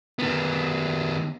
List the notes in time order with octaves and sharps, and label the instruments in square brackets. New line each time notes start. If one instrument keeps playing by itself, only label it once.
[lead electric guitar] D#3 B3